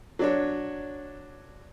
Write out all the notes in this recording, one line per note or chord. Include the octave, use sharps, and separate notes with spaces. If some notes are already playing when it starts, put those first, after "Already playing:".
F#3 D4 C#5